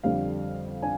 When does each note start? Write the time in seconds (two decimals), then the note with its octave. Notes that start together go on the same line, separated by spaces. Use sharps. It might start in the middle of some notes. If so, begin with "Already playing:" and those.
0.03 F2 D3 G3 D4 F5
0.82 D4 G#5